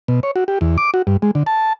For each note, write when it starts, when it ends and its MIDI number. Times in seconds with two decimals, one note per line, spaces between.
0.08 0.20 47
0.23 0.31 73
0.36 0.44 66
0.48 0.59 67
0.61 0.77 40
0.78 0.91 86
0.94 1.02 66
1.07 1.17 43
1.22 1.31 56
1.35 1.43 50
1.46 1.73 81